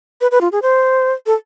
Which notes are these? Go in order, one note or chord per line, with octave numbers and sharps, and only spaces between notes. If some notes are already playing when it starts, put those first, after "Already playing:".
B4
B4
F4
G#4
C5
A4